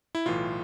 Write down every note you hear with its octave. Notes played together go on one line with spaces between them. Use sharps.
E4
B1 A2 E3 F4